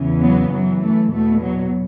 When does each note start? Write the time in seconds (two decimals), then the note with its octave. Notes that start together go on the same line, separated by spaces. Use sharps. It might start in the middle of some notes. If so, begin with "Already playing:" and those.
Already playing: E2 C#3 E3
0.22 F#3 B3
0.52 F#2 E3 F#3
0.82 A3
1.12 E2 B2 A3
1.42 F#3